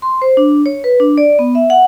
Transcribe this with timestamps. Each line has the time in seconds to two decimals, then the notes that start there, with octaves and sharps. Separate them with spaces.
0.02 C6
0.22 C5
0.37 D4
0.66 C#5
0.84 B4
1.00 D4
1.18 D5
1.39 B3
1.55 E5
1.70 F#5